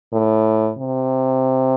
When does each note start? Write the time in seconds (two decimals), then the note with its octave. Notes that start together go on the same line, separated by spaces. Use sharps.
0.13 A2
0.78 C3